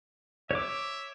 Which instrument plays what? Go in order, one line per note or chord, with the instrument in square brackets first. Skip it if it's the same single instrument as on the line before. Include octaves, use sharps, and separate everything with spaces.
[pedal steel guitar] C#5 D6 [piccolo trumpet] E5